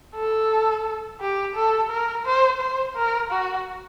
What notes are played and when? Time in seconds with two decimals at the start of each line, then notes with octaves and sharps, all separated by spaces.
0.15 A4
1.21 G4
1.56 A4
1.91 A#4
2.26 C5
2.61 C5
2.96 A#4
3.31 F#4